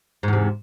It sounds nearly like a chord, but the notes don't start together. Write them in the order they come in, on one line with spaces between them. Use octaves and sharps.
G#2 E2 C3